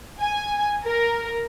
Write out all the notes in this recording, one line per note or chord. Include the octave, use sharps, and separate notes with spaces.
G#5
A#4